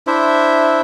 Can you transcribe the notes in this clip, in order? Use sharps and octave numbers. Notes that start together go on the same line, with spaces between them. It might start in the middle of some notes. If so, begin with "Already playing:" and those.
D4 E4 C5 E5